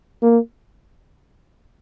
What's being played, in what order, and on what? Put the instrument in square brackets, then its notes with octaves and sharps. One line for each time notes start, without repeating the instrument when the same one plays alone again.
[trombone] A#3